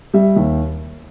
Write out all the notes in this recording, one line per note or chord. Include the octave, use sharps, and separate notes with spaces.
G3 E5
D#2